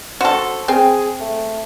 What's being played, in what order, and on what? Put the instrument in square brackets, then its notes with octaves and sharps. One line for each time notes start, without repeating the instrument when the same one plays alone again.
[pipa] F#4 A4 [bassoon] C5
[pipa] C4 [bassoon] G#4
[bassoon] A3